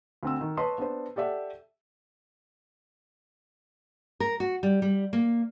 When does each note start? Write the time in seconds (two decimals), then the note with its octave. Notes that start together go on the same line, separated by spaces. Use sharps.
0.23 D2 C4 E6
0.41 D#3
0.57 B4 C#5 D#5 A5 C6
0.78 B3 D4 C5
1.16 G4 A4 D5 E5 F#5
4.20 A#4
4.40 F#4
4.63 G3
4.82 G3
5.13 A#3